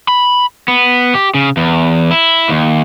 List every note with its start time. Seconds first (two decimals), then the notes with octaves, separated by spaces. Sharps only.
0.08 B5
0.68 B3
1.14 G4
1.34 C#3
1.57 E2
2.11 E4
2.49 D#2